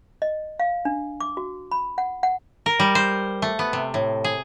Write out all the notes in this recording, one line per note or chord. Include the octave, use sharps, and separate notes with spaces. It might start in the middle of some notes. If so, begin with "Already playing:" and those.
D#5
F5
D4
D6
F#4
B5
F#5
F#5
A#4
G3
C5
A3
B3
C3
A2
G#4